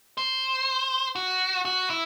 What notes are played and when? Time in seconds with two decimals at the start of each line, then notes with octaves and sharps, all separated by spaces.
0.18 C5
1.16 F#4
1.65 F#4
1.90 E4